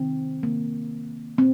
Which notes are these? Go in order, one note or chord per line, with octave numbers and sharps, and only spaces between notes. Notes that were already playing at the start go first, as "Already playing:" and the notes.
Already playing: C3 D#3 C4
C3 D#3 A#3
A#2 C4